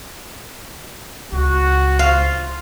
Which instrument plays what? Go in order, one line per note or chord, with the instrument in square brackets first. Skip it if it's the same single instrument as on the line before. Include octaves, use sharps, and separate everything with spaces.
[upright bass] C#2 [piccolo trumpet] F#4
[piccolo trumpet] F4 [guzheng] F5